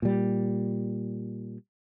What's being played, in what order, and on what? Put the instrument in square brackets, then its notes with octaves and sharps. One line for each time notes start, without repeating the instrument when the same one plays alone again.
[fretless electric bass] A#2 G3